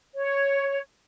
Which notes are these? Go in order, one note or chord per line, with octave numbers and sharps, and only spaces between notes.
C#5